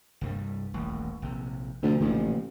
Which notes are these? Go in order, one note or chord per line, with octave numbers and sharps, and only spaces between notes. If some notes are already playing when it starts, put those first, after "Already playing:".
C2 G2 G3
D#1 A1
A#1 C3
D2 C3 F3
A1 A#2 C#3 F3